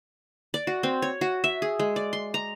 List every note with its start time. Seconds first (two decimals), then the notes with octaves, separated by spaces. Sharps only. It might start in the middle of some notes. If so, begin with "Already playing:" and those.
0.54 D5
0.67 F#4
0.83 C4
1.02 C#5
1.21 F#4
1.44 E5
1.62 G#4
1.79 G#3
1.96 D5
2.13 C6
2.34 A#5